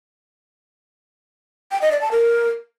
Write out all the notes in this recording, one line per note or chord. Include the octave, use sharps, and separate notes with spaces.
G5
D#5
D5
A5
A#4